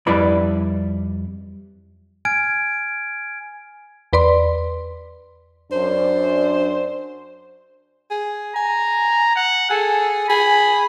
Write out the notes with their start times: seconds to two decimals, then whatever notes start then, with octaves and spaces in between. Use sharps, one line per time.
0.07 F2 G3 E4 B4 D5 B5
2.25 G#5 F6 G#6 D7
4.13 E2 B4 D5 C6
5.72 F#2 D4 C5
8.11 G#4
8.56 G#5 A#5
9.36 F#5
9.70 G#4 A4
10.30 G#4 B5